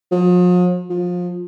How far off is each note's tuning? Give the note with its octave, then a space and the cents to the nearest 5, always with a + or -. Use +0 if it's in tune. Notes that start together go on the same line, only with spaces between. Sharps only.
F3 +45
F3 +25